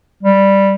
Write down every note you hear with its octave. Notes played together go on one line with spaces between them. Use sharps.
G3